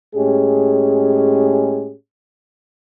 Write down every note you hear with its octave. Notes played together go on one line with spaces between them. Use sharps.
A2 G#3 C#4 G4 G#4